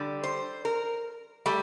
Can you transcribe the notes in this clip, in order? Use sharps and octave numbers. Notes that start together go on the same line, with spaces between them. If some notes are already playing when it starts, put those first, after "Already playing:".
Already playing: D3 G3
C5
A#4
G3 A3